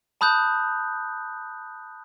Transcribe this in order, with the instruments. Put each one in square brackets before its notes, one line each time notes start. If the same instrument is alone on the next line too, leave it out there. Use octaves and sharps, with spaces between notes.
[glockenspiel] A5 B5 D#6 F#6 G6